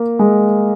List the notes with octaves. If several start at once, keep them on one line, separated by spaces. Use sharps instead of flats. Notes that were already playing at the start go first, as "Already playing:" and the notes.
Already playing: A#3
G#3